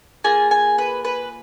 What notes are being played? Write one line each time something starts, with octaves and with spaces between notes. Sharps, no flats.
A#3 F4 G#4 G#5
G#5
B4
B4